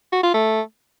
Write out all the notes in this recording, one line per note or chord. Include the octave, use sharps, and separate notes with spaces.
F#4
F4
A3